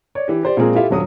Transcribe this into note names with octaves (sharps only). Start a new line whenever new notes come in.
C#5 D5
E3 G4
G4 C5 D5
A#2 F3 G#3 C4 G#4 A#4
E4 F4 G4 A4 E5 F5
D#1 G2 F#3 D#6